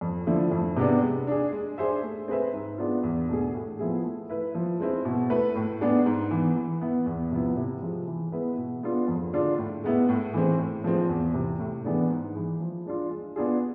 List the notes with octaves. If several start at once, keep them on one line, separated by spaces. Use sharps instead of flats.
F2
D3 F3 A3 E4
F2
C3 G#3 B3 D4
G#3
D4 G#4
G#3
D4 G#4 C5 E5
A3
C4 G#4 B4 E5
G#2
G#3 B3 D4 F4
E2
B2 A3 D4 G#4
A2
F3 B3 E4 G#4
A3
E4 B4
F3
G#3 C4 E4
B2
A3 E4 B4
A2
G#3 B3 D4 G#4
G#2
E3 B3
E3
B3 E4
E2
C3 F3 B3 E4
C3
F3 G#3
E3
G#3 B3 E4 B4
B2
G#3 B3 D4 F4
F2
D3 G#3 D4 F4
A2
G#3 B3 E4
A2
E3 G#3 C4
A2
F3 G#3 C4
E2
C3 E3
A2
E3 G#3 B3 D4
G#2
E3 G#3
F3
G#3 D4 F4
G#3
B3 D4 F4 G#4